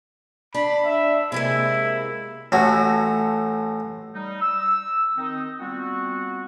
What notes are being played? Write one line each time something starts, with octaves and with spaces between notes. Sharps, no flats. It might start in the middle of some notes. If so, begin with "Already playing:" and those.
D4 B5
E5
C3 G#3 A#3 E4
A1 A2 F#4
G3 D#4
E6
D#3 C4 D#4
G3 B3 C4 F4 F#4